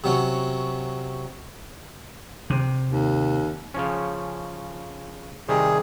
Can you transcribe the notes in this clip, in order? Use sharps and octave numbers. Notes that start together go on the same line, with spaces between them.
C3 F#3 C#4
C3
D#2
C#3 F3 C#4
C3 D#3 G3 G#4